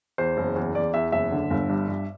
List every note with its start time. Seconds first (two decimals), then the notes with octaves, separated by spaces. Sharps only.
0.18 E2 C5
0.37 F#1
0.56 E2
0.75 E2 D5
0.94 E2 E5
1.12 F#1 E5
1.32 D3
1.50 G1
1.69 G2
1.88 G2